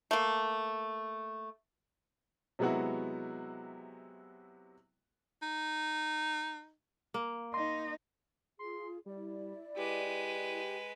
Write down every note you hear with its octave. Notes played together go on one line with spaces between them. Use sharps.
A3 A#3
C3 F#3 G#3 B3 E4 F#4
D#4
A#3
D#4 C6
F4 G#4 C6
G3 E4 D5
G#3 G4 B4